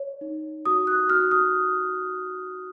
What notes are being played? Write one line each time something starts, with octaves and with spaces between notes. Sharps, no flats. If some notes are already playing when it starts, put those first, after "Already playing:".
Already playing: C#5
D#4
F#4 D#6
F#6
F#4 F6
D#6